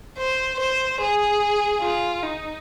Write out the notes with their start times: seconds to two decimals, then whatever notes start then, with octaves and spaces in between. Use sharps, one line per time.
0.18 C5
0.59 C5
1.00 G#4
1.81 F4
2.23 D#4